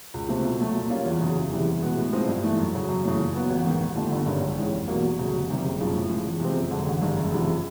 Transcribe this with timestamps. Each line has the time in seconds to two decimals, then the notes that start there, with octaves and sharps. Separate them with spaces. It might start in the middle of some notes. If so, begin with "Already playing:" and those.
0.14 C#2
0.29 C3 F3 A3 C4
0.44 B2
0.60 F#3 A3
0.75 A#2
0.90 G3 A#3 C#4 F4
1.05 E2
1.21 C#3 F#3
1.36 F#1
1.51 E2 C3 E3 G3
1.67 E2
1.81 B2 G#3 B3
1.97 A2
2.13 F3 G#3 C4 D#4
2.27 G2
2.43 E3 A3
2.57 F#2
2.74 C#3 F#3
2.89 F#2
3.04 C#3 E3 A3 C#4
3.19 A#2
3.34 F#3 B3
3.50 A1
3.65 G#2 D#3
3.80 D#2
3.95 D3 F3 A3 D4
4.12 G1
4.26 G2 D#3 G#3 C#4
4.41 A#1
4.57 G#2 E3 G#3 C#4
4.72 F1
4.88 E2 B2 F#3 A#3
5.03 E1
5.18 D2 C#3 F#3
5.33 F1
5.49 F2 C3 D#3 G3
5.64 F#1
5.79 F#2 C#3 F3
5.95 A2
6.10 F3 G#3
6.25 E2
6.40 C3 F3 G#3 C4
6.56 F#1
6.71 F#2 D3
6.86 A1
7.02 G2 D#3 G#3
7.17 F#1
7.32 E2 C3 F3